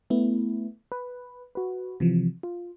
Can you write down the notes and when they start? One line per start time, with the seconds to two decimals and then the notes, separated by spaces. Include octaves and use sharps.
0.10 A3 B3 E4
0.92 B4
1.55 F#4 B4
2.00 C3 E3 F3
2.43 F4